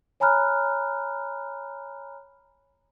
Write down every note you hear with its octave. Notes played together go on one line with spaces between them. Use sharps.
C#5 G#5 A#5 B5 F6 F#6